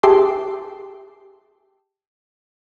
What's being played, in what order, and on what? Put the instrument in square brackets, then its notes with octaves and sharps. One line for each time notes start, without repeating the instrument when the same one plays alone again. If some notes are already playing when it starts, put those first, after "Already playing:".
[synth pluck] G4 G#4 E5 A5 C6 D6